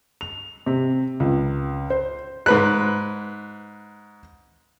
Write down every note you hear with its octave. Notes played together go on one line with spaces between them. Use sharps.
F7
C3
C#2
C5
G#2 B4 F#6